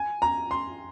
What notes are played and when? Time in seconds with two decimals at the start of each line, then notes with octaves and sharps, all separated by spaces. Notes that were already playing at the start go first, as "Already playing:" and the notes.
Already playing: G#5
0.22 A#5
0.51 C6